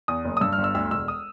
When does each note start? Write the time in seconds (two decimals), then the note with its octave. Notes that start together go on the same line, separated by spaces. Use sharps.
0.08 E2 D#6
0.25 F#1
0.37 D#6
0.41 G2 E6
0.53 F6
0.58 G1
0.64 E6
0.75 D2 E6
0.91 E1 E6
1.08 D#6